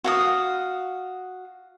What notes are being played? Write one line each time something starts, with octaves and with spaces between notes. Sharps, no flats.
F#4 F5 D#6